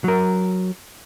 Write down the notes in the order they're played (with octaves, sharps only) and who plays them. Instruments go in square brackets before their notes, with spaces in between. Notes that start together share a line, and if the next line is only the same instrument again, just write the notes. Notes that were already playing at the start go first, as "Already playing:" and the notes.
[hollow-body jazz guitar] F#3 A#4